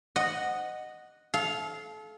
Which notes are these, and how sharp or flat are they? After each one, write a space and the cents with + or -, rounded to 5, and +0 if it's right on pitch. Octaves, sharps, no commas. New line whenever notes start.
D#5 -10 F#5 +0
A4 -35 F5 +0